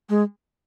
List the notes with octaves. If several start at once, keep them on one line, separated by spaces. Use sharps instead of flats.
G#3